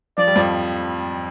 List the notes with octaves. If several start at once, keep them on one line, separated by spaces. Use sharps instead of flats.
F3 D5
G3
F2 F3